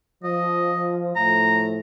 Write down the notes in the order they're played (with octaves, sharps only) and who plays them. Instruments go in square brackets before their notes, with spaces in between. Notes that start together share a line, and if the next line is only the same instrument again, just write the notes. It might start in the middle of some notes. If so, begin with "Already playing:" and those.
[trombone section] F3 [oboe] D#5
[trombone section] A2 F3 [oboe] A#5